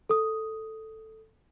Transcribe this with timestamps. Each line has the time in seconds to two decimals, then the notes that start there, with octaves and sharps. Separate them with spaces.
0.09 A4 D#6